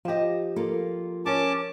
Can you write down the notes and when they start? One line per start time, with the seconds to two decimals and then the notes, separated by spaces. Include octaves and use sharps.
0.05 F3 G4 D#5 A5
0.56 A#3 F4 A4
1.26 C#4 A#4 C#5 A5 D6